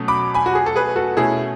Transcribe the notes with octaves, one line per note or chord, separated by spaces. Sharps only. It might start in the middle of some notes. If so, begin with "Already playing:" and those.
Already playing: B2 F#3 A3 C#4
B5 D6
G#5 B5
F#4
G#4
A4
G#4 B4
F#4 A4
B2 A3 C#4 E4 G#4